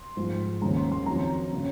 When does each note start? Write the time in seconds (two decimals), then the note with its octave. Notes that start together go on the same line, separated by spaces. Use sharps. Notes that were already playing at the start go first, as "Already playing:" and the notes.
Already playing: C6
0.17 G#2 F3 G#3
0.61 D#2 C#3 G#3 A#5
0.77 C6
0.92 C6
1.06 F2 D#3 F#3 A#5
1.53 C#3 F#3